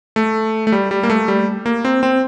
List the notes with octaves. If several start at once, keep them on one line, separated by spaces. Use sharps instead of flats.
A3
A3
G3
G3
A#3
A3
G3
A#3
C4
C4